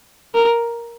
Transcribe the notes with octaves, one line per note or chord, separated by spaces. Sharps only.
A#4